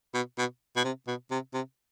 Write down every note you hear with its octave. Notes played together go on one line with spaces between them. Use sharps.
B2
B2
B2
C3
B2
C3
C3